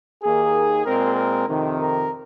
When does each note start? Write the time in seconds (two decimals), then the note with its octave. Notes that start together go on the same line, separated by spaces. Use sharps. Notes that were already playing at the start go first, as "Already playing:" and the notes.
0.23 D#2 D#3 A#3 G#4
0.85 A#2 G#3 C4 A#4
1.16 A#4
1.47 F2 C3 D#3
1.77 A#4